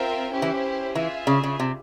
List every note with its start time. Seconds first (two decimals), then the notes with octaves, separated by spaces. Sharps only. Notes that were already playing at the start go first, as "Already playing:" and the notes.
Already playing: C4 F4 A#4 E5 G5
0.32 C#4 E4 G4 C5
0.42 E3
0.95 E3 F4 G#4 E5
1.27 C#3
1.44 C#3
1.60 C3